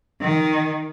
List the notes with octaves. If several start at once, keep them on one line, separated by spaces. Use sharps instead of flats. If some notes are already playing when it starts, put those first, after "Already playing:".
D#3